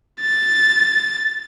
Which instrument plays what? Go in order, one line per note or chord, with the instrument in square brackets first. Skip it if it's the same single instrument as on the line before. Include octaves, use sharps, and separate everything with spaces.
[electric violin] A6